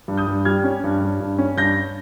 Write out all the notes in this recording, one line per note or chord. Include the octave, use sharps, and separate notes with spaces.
G2
D#6 G6
G2
G3 F6 G#6
C#4
G2
G2
G2
C#4
G2 G6 A#6